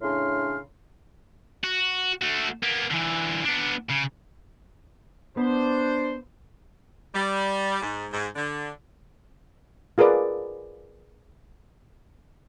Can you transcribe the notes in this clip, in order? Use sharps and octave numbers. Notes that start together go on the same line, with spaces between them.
A2 C#3 D4 C6 F6
F#4
A3 F#4
A#3 B3
D3 E3
B3 D4
C#3
B3 D4 C5
G3
G#2
G#2
D3
F4 G#4 A#4 B4 D5